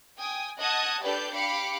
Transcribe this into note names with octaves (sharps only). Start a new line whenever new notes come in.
G5 G#5 D#6
D#5 F#5 A5 D#6 F#6 G#6
D4 G4 A4 B4 D5 G6
G4 F5 B5 D6 C#7